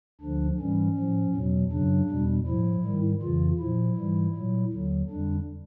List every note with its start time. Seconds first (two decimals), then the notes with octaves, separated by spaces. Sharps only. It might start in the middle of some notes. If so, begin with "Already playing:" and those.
0.21 D2 D3 F3 D4
0.59 G#2 E3 G3 C#4
0.97 A2 F3
1.34 E2 B2 F#3
1.72 F#2 C#3 F#3 D4
2.09 E2 B2 G3
2.47 A2 F3 E4
2.84 G#2 D#3 G3
3.22 F2 C#3 E3 F4
3.59 A#2 F3 E4
3.97 G#2 E3 G3
4.35 A#2 F#3
4.72 D#2 D3 F#3
5.10 F2 D3 G3 D4